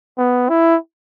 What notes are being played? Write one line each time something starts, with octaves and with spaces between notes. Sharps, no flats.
B3
E4